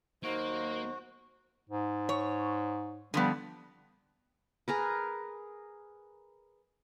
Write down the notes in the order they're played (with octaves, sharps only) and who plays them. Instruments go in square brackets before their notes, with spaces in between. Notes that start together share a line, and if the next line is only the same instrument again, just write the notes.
[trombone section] D#2 F#3 D#4 [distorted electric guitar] A#3 [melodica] F#4 [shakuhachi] C5
[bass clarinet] G#2
[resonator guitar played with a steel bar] C#5
[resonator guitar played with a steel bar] D3 F3 B3 [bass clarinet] G3
[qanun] G#4 A#4 B4